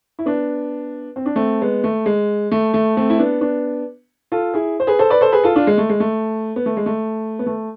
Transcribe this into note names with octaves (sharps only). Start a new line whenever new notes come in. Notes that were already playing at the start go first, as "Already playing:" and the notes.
E4
B3 D4
C4
D4
A3 C4
G#3 B3
A3
G#3
A3
A3
A3 C4
E4
B3 D4
B3 D4
F4 A4
E4 G#4
C5
G#4 B4
A4 C5
B4 D5
A4 C5
G#4 B4
F4 A4
D4 F4
G#3
A3
G#3
A3
B3
A3
G#3
A3
B3
A3